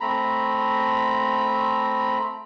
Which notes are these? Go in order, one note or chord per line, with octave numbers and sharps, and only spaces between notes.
A3 C4 A#5 B5